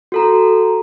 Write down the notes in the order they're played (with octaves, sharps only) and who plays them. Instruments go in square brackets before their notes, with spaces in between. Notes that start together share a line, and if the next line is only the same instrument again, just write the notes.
[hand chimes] F#4 A4 A#5